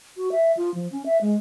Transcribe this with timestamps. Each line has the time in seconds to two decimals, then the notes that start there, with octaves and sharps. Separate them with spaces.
0.17 F#4
0.32 E5
0.57 F4
0.74 F3
0.92 C#4
1.06 E5
1.21 G#3